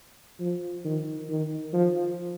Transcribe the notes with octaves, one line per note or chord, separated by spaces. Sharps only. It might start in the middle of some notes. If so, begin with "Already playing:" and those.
F3
D#3
D#3
F3